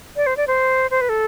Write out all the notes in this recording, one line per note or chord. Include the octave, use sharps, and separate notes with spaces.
D5
C5
D5
C5
C5
B4
A4